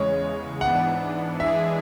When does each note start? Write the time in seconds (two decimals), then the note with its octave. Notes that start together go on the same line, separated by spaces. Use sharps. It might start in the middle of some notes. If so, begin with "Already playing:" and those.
Already playing: E2 C#3 G#3 C#5
0.61 G#2 E3 B3 D4 F#5
1.39 E3 G#3 D4 G#4 E5